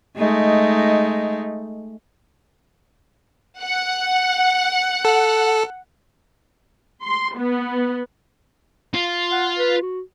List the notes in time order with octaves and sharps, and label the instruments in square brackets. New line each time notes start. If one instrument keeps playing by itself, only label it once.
[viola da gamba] G#3 A3 D#4
[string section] F#5
[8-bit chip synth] A4
[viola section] C6
B3
[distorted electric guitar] F4
[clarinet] F#5
B4
F#4